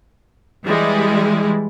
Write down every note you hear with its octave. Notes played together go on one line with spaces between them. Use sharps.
E3 G3 G#3 E4